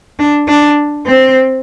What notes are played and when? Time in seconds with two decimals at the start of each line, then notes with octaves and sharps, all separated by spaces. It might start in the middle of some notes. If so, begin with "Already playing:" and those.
0.19 D4
0.48 D4
1.06 C4